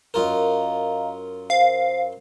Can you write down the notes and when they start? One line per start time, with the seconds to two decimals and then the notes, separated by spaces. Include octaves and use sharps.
0.14 F#2 F4 A#4 D#5 F5 A#5
1.50 C5 F5